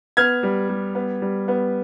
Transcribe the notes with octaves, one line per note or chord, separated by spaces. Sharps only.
B3 F6 G#6
G3
G3
B3
G3
B3